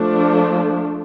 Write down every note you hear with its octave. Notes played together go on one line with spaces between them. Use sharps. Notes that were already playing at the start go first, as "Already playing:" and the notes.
Already playing: F3 A3 D4